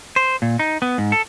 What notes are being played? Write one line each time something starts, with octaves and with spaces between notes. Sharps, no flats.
C5
A#2
D#4
B3
G#2
A4